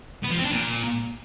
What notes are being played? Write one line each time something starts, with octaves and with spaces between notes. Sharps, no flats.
B3
F3
C4
D4
A#2